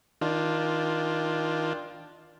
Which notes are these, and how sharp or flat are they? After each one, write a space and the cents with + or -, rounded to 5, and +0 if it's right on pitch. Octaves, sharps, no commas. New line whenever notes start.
D#3 +25 D4 +5 F4 +5